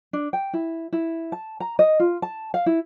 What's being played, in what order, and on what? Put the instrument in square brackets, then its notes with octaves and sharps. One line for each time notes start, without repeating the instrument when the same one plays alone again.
[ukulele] D4
G5
E4
E4
A5
A#5
D#5
F4
A5
F5
E4